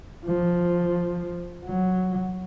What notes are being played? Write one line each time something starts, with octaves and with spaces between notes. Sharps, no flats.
F3
F#3